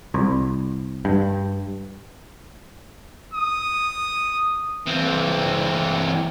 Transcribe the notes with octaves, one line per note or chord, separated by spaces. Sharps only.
C2
G2
D#6
E3 C4